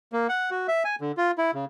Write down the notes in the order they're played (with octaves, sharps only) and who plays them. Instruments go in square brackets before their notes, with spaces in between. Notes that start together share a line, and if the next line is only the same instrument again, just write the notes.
[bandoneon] A#3
F#5
F#4
E5
G#5
D3
F4
E4
C#3